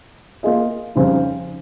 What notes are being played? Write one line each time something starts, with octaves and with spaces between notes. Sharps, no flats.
A#3 F4 G#4 D#5
F2 C#3 G3 C4 D#4